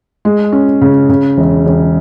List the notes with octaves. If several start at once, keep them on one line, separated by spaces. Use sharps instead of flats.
G#3
C#4
C#3
C#3
E1
E1